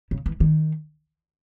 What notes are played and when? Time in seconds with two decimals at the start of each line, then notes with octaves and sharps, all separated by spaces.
0.11 C#3
0.26 E3
0.40 D#3